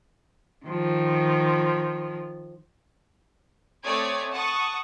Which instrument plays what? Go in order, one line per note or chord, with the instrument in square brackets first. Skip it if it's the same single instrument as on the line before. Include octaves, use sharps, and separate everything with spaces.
[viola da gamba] D#3 F3
[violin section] A3 C4 C#5 D5 D#6 G#6
F#5 A5 C#6 D#6